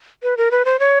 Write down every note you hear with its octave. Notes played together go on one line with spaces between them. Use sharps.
B4
A#4
B4
C5
C#5